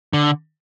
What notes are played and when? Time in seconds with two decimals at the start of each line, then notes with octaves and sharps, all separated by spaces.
0.13 D3